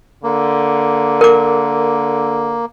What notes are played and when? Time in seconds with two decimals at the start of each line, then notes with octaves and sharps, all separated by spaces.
0.24 D3 A#3
1.21 A#4 D6